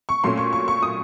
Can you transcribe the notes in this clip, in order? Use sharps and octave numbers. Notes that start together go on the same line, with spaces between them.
C#6
A#2 F#3 A3 C#4 C6
C#6
C#6
C#6
D#6